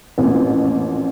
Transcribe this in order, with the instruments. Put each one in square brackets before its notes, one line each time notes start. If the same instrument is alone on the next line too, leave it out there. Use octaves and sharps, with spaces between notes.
[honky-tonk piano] A1 F2 A#2